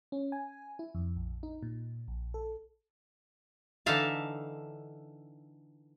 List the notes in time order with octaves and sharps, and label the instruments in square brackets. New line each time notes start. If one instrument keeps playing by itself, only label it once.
[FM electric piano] C#4
G#5
E4
F2
A#1
D#4
A#2
A#1
A4
[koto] D3 E3 D#4 E5 F5 A5